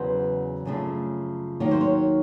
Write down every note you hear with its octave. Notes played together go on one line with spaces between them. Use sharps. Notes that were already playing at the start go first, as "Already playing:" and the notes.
Already playing: E2 C#3 F#3 B3 C5
F#2 C#3 F3 A3 D4
D#2 D#3 F#3 A#3 C#5
C5
C#5